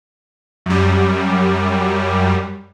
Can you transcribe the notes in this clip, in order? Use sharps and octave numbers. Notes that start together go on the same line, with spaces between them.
F#2 G3